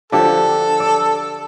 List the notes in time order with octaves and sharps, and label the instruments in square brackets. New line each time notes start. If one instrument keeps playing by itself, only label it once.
[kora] D3 F3 G4 [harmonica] A4
[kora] D5